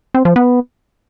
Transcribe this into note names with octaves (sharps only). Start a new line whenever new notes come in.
C4
F3
B3